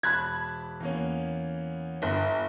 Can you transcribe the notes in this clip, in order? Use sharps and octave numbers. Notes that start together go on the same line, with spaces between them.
E1 A5 B5 F#6 G#6
E2 A#3 C#4
G1